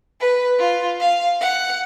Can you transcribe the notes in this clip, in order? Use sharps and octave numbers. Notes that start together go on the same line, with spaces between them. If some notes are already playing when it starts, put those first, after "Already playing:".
B4
F4
F5
F#5